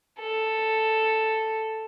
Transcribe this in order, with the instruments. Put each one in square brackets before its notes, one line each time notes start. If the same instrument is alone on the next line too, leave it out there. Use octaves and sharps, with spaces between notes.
[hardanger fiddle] A4